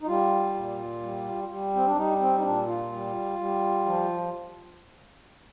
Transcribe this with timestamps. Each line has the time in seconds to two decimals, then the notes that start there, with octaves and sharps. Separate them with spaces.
0.02 D#4
0.07 G3 F4
0.54 A#2
1.02 G3
1.49 G3
1.76 C4
1.86 D4
1.96 G3 D#4
2.20 C4
2.38 D#4
2.43 A#2 D4
2.67 F4
2.92 G3
3.39 G3
3.86 F3